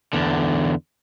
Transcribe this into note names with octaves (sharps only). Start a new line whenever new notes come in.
E2 D3